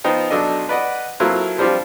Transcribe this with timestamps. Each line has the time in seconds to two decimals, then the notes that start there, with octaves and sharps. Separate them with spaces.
0.04 F3 B3 D#4 C5 G5
0.30 B1 F#3 D4 A4 D#5
0.69 B4 D5 D#5 F#5
1.20 F#3 A#3 C4 E4 F4 A4
1.58 F3 G3 C4 D4 F4 G4